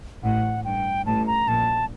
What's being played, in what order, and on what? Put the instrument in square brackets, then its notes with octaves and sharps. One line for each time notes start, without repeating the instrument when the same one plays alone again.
[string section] A1 A2 [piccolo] F#5
[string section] G2 [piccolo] G5
[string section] A1 A2 [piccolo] A5
[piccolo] A#5
[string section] A#1 A#2 [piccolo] A5